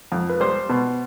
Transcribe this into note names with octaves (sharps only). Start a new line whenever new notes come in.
F2
B4
G3 C5
B2